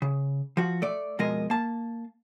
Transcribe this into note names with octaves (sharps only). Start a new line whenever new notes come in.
C#3
F3 F#4
A3 D5
F2 B2 G#3 A#4 D#5
A#3 A5